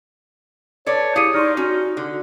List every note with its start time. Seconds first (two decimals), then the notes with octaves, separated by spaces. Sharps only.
0.86 A4 B4 C#5 D5
1.16 E4 G4 G#4 F5 C#7 D#7
1.34 D#4 D5 C6 C#6 F6
1.57 C#4 F#4
1.97 D3